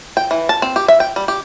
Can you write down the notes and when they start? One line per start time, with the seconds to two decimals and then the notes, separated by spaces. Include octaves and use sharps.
0.17 G5
0.31 E3
0.49 A5
0.62 C4
0.76 G4
0.88 E5
1.00 G5
1.16 G3
1.28 G4